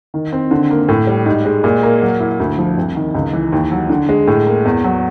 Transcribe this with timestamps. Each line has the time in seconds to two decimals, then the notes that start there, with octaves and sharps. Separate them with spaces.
0.14 D#3
0.32 C4
0.51 D3
0.71 A#3
0.89 A2
1.07 G3
1.26 G#2
1.45 G#3
1.64 A#2
1.83 A#3
2.02 F#3
2.20 E4
2.40 D2
2.58 F3
2.77 C2
2.96 D#3
3.15 C#2
3.33 E3
3.52 D#2
3.72 F#3
3.89 D3
4.09 G#3
4.27 A2
4.46 A#3
4.65 E2
4.84 F#3